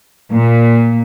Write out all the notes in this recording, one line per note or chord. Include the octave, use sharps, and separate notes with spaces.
A#2